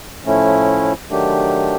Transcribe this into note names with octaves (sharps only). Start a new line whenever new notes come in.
A2 F3 A3 C#4 E4
D#3 F#3 A3 D4 G4